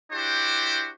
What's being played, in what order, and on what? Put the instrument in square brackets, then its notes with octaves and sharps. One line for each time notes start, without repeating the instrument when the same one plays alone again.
[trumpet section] D4 E4 F#4 G4 C5